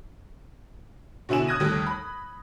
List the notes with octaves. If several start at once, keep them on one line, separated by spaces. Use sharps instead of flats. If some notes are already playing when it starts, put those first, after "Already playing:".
B2 D3 E4 G#5 E7
D#6 F#6 G#6 A#6 D#7
D#2 G3 A3
B5